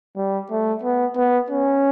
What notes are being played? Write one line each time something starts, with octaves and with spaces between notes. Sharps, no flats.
G3
A3
B3
B3
C#4